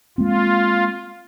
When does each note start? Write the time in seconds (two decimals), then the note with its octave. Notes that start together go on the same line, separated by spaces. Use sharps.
0.18 G#3 A#3 C4 F4